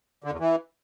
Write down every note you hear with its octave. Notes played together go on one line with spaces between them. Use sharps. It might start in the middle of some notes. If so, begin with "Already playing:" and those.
D3
E2
E3